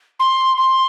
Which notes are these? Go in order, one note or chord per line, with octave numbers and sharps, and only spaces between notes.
C6
C6